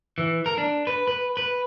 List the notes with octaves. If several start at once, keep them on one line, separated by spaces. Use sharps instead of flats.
E3
A#4
D4
B4
B4
B4